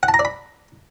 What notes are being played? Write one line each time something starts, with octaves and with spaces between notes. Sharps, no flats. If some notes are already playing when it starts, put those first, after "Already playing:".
F#5
A5
A#5
D5
B5